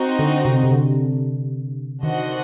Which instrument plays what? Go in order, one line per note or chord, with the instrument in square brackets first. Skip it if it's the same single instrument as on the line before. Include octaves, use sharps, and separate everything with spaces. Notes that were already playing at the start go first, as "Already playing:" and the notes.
Already playing: [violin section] C4 D#4 F#4
[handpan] D3
C3
C3
D3
[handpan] D#3 [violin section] D4 F#4 C5 D#5 F#5